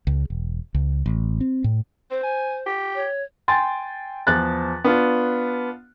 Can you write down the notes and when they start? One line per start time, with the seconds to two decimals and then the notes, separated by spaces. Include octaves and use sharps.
0.07 C#2
0.30 E1
0.74 C#2
1.06 A1
1.41 C4
1.64 A2
2.11 C4 C5
2.23 G#5
2.66 G4
2.94 C#5
3.48 G5 G#5 C6 A6
4.27 E2 F3 F#6 A6
4.84 B3 D4 F4